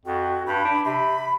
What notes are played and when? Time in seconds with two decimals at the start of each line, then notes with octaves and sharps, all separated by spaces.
0.05 F2 F#4
0.46 G2 B5
0.64 D4
0.85 C3 B5